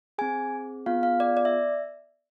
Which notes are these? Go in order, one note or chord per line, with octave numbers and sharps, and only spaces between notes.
C4 G#4 G#5
B3 F4 G#4 F5
F5
D5
D5
E5